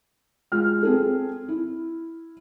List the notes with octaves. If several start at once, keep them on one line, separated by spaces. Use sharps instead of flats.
G#3 F4 F6
C4 G#4 A4
E4